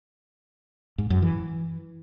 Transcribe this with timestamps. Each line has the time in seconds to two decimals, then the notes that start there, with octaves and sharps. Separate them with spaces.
0.98 G#2
1.10 F#2
1.22 E3